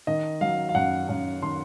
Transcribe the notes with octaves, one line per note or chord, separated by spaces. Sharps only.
D#3 D#5
F#3 F5
F5
F#2 F#5
F#2
D#3 C6